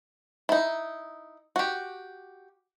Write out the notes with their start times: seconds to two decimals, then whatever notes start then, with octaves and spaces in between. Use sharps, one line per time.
0.49 D#4 E4
1.56 F#4 G4